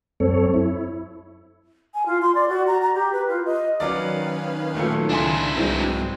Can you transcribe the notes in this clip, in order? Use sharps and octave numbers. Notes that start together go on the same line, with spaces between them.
F#2 C4 A4 C#5
E4
G#5
F4
C6
D5
F#4
A#5
A#5
G4
B4
F4
D#5
D#3 F#3 C#4 B4 D5 F5
A#2 F#3 A3
C#2 D4 E4 G#5 C6
C2 G#2 E3 F#3 G#3 C4